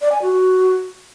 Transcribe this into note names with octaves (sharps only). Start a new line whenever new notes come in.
D5
G#5
F#4